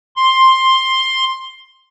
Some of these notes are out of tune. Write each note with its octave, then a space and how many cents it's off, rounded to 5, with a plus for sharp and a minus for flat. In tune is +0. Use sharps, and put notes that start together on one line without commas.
C6 +10